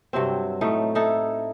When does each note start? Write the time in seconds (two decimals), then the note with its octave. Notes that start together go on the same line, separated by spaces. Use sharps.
0.13 G2 C3 F#3 C4
0.61 A2 A3 D#4
0.95 D#4 E4 A4